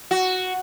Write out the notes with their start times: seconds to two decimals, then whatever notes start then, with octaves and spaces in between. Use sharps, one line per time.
0.11 F#4